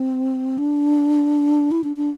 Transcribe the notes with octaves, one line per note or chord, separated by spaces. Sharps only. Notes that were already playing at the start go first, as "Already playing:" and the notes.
Already playing: C4
D4
E4
D4
D4